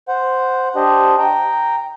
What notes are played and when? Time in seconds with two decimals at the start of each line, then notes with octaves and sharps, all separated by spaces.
0.08 C5 F#5
0.76 D4 G4 C5 D#5
1.18 G5 A#5